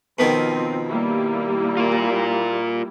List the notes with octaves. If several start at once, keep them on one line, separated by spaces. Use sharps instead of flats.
B2 D#3 F3 C4
G3 A#3 E4
F4 A#4